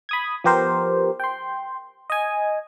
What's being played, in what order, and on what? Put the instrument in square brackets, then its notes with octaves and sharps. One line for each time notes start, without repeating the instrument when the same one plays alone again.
[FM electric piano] B5 D#6 G#6
F3 B3 G4 A#4 C5
G5 C6
D#5 G#5